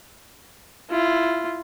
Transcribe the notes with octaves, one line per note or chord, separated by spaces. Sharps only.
E4 F4